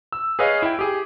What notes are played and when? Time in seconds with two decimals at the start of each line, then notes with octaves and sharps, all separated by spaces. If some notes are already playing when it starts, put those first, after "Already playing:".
0.12 E6
0.39 G#4 B4 C#5 D#5 F5
0.62 E4 G5
0.79 G4 G#4